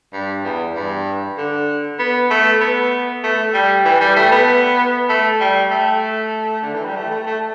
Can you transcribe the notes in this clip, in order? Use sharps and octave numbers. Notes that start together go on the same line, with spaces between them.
G2
E2
G2
D3
B3
A3
B3
A3
G3
E3
G3
A3
B3
A3
G3
A3
D3
E3
G3
A3
A3
A3